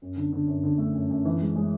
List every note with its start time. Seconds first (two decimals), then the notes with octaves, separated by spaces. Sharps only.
0.02 F#2
0.16 D3
0.32 D3
0.47 F#2
0.63 D3
0.78 A3
0.94 F#2
1.09 F#2
1.25 E3
1.41 G#3
1.55 G#3